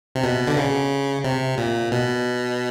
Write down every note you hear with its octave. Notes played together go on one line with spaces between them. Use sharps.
C3
B2
D3
C#3
C3
A#2
B2